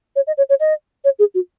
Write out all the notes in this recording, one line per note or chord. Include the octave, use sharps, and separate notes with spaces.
C#5
D#5
C#5
C#5
D#5
C#5
G#4
F#4